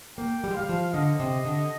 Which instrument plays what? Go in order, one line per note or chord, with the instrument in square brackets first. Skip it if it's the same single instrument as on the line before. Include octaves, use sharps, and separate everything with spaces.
[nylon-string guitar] A#3 [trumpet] G5
[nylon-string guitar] G3
G#3
[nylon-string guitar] G3 [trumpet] F5
[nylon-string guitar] F3
[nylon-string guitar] D3 [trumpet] D#5
[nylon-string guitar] C3
D3